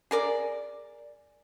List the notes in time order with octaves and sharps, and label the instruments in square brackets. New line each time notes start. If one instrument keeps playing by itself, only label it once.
[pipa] G#4 A#4 D5